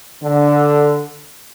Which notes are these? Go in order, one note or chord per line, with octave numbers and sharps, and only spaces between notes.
D3